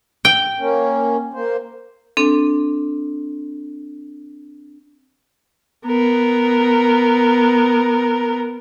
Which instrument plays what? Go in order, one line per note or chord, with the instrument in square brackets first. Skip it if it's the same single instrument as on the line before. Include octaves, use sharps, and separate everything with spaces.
[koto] G5
[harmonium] A#3 C#4
A#3 C5
[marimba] C4 D4 A4
[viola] B3 A#4